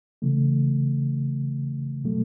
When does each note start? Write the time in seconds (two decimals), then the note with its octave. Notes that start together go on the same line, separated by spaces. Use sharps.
0.22 C#3 E3 A3
2.04 B2 F#3 A3